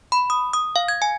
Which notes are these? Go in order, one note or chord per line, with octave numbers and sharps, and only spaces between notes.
B5
D#6
D#6
F5
G#6
G#5